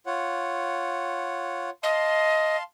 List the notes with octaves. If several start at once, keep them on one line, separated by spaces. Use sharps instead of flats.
F4 C#5 F#5
D#5 F5 A5 C6